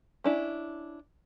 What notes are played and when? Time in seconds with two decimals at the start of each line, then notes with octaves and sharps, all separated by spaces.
0.24 C#4 D4 E4